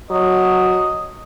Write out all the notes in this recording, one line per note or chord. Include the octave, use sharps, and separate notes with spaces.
F#3 D#5